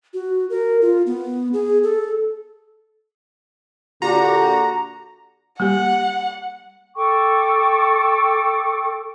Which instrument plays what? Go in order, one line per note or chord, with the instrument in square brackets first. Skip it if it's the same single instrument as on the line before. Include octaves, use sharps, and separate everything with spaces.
[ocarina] F#4
A#4
F4
B3
G#4
A4
[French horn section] A#2 D3 [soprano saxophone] F#4 [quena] G4 [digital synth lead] A#5
[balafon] G3 A#3 G4 [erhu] F#5
[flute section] A4 G5 C#6 D6